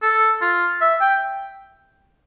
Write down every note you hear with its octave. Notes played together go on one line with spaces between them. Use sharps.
A4
F4
E5
G5